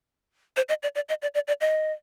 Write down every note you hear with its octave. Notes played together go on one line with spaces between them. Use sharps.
C5
D#5
D5
D5
D#5
D5
D5
D5
D#5